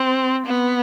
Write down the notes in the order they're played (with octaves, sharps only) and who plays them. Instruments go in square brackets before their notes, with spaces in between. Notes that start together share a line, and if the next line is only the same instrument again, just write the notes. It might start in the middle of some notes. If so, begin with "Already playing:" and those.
Already playing: [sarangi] C4
B3